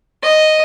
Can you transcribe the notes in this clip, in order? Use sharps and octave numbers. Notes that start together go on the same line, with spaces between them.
D#5